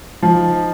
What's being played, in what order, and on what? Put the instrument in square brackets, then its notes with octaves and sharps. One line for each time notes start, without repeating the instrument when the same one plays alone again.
[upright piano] F3 [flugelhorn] D#4